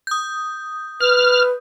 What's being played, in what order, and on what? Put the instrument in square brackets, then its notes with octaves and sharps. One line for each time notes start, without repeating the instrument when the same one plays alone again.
[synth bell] D#6 G6
[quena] B4 [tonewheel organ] F6